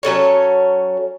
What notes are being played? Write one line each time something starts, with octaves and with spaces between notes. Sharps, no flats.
F#3 C#4 A4 C#5